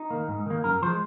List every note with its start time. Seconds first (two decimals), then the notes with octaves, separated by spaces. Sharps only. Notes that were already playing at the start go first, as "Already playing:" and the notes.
Already playing: D#4
0.11 D#3 A#3
0.28 G#2
0.46 D#3 A#3
0.64 F#2 A#4
0.82 F3 G#3 C5